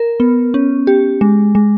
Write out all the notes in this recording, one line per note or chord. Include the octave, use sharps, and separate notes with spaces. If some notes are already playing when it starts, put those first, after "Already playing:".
Already playing: A#4
B3
C#4
G4
G#3
G#3